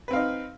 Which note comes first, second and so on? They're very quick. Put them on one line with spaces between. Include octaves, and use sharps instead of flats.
B4 C4 F5 D#4